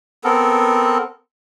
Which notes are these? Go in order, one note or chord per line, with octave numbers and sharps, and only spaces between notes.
B3 C4 A4 A#4